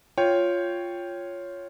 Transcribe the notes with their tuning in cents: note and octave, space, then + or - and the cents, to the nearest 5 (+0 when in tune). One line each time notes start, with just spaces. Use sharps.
F4 +0 C#5 +0 G5 +0